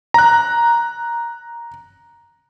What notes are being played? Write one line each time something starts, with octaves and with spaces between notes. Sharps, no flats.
A#5 F#6